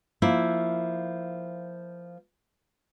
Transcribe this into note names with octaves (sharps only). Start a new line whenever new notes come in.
F3 A#3 E4